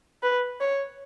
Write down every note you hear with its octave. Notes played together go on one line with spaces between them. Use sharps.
B4
C#5